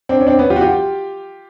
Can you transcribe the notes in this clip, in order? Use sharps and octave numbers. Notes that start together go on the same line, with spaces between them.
C4 D4
C#4
C4 D4
B3 C#4
F4 G4
F#4
F4 G4